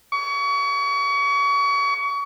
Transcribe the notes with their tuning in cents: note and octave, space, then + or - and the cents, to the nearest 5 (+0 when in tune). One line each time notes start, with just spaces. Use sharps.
C#6 +35